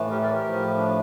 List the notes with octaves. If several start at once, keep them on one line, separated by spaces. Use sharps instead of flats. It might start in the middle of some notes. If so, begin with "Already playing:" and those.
Already playing: A2 E3 A3
G4 A#4
A#4 D5
G4 A#4
A2 F3 A3
D4